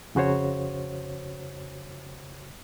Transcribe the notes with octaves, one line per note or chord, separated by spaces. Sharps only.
F2 C#3 F#4 C5 C#5